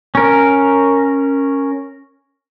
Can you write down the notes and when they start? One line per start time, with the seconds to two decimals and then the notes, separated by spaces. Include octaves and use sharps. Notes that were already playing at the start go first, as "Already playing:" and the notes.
0.15 C#4 A#4